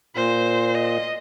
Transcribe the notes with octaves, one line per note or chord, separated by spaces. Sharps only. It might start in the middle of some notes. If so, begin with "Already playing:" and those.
A#2 C5
D#5